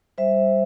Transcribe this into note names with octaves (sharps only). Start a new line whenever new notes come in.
G3 C5 E5